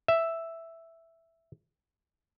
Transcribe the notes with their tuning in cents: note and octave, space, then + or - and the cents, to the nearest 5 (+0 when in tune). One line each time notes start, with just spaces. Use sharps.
E5 +0